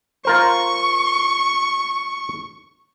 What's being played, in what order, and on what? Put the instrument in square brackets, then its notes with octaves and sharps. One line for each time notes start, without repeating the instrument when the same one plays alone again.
[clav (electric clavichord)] F4 A#4 C5 [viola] C#6